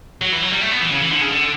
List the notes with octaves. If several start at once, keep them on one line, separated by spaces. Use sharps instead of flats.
F#3
E3
F#3
G3
A3
B3
E3
C#3
E3
D3
C#3
D3